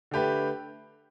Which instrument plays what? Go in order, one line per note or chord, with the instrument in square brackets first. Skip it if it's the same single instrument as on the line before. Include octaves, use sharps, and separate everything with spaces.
[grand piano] D3 A3 G4 B4